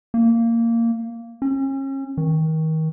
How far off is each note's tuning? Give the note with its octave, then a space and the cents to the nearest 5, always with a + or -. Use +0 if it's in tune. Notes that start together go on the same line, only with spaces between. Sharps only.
A#3 -15
C#4 -35
D#3 +30